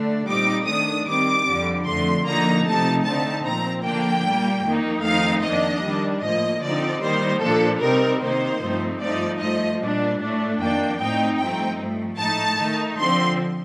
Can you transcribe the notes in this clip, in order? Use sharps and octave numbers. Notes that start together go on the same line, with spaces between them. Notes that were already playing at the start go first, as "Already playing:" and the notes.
Already playing: D3 A3 D4
A#2 G3 C4 D#4 D6
D#3 A3 D4 D#6
D#3 G3 C4 D6
F2 D3 G3
F2 D3 A3 C6
D3 F3 A#3 D#4 A#5
C3 F3 A3 D#4 A5
D3 A3 C4 D#4 A5
A#2 F3 C4 A#5
D3 F3 A#3 D4 G5
A#2 G3 A#3
F2 D#3 A#3 D#4
F2 D#3 A3 C4 D#4 F5
F2 D#3 A#3 D4 D#5
D#3 G3 D4
A2 F3 A#3 D#5
D3 F3 C4 D#4 D5
D#3 G3 A#3 D#4 C5
A#2 F3 A#3 D4 A4
C3 G3 C4 D#4 A#4
C3 D#3 A#3 D#4 C5
G2 F3 A3 C4 D#4
G2 F3 A3 D#4 D5
G2 F3 A3 D#5
A#2 G3 D4
A2 A3 D4
F2 D#3 A#3 D4 G5
A2 A3 C4 D#4 G5
G2 F3 A3 C4 D#4 G5
G2 F3 A3
A2 A3 D#4 A5
D#3 A3 D#4
D3 F3 C4 C6